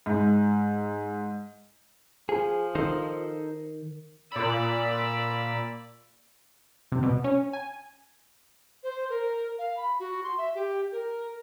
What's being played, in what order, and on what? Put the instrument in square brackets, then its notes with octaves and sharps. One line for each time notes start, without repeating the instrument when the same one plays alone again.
[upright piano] G#2
[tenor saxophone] F3 [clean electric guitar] G#4
[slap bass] D#3 [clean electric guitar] D#4 A4 C5
[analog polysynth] A#2 B5 [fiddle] D5 E6
[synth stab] C3
B2
C#4
G#5
[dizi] C5
A#4
F5
B5
F#4
C6
E5
G4
A#4